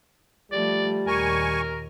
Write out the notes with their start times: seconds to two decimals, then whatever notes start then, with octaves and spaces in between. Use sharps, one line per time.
0.52 F3 G3 A3 D5
1.07 D#2 A#2 A#4 G#5 C#6